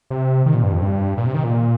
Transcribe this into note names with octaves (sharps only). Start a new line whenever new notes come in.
C3
D#3
A#2
G2
F2
G2
A#2
C3
D#3
A#2